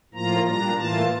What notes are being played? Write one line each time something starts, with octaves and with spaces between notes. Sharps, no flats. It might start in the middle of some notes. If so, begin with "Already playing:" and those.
A2 F3 A#3 F4 A#5
A#2 G3 D4 A#5
A2 E3 A#3 F4 A5